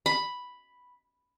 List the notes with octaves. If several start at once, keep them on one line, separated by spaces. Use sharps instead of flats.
B5